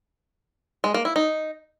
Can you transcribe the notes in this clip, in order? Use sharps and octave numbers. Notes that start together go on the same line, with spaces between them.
G#3
A#3
E4
D#4